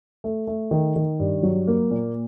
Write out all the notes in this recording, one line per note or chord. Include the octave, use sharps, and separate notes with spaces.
A3
A3
D#3
D#3
G2
F#3
A#3
A#2